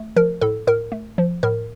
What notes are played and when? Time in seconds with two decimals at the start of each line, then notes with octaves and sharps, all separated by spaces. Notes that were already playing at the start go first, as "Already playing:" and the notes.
Already playing: A3
0.16 F3 A#4
0.41 A2 A4
0.67 A2 A#4
0.92 A3
1.18 F3
1.43 A2 A#4